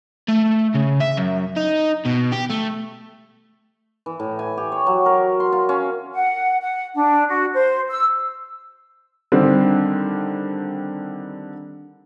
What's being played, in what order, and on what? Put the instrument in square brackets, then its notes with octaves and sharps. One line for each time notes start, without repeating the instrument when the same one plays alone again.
[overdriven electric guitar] A3
C#3
E5
F#2
D#4
B2
G4
A3
[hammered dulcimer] E3
A2
G#5
G4
C#5
F#3
A#4
C6
F4
C#4
[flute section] F#5
F#5
D4
F#4
C5
E6
[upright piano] D3 D#3 G3 C4